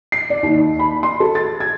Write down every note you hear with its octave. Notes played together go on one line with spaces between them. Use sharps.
C7
D5
D#2
B5
C6
A4
A6
G#6